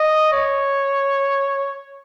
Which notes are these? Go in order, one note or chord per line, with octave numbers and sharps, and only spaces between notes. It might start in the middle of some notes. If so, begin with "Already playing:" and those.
Already playing: D#5
C#5